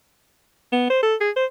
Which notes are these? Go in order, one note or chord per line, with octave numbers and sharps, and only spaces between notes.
B3
C5
A4
G#4
C5